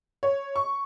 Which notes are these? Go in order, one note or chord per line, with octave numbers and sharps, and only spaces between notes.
C#5
C#6